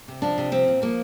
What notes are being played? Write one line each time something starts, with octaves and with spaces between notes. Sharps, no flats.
C3
F3 D4
C3
F3 C4
A#2
F3 A#3